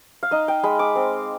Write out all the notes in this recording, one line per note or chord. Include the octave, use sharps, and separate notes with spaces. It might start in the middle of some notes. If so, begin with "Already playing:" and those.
F5
D#4 D#5
G5
G#3 B5
D6
C4